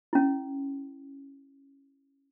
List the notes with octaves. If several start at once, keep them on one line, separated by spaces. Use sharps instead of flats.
C#4 E4